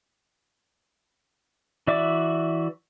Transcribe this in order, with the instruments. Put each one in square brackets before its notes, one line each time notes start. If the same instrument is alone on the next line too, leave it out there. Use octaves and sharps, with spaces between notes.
[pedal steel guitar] E3 F#4 D5 E5 D6